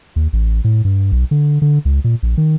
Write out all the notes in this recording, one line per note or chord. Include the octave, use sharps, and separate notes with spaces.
D#2
A1
A2
G2
B1
D3
D3
C#2
A#2
A#1
D#3